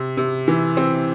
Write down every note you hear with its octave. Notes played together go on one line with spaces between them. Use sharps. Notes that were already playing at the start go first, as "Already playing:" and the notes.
Already playing: C3
C3
E3
C4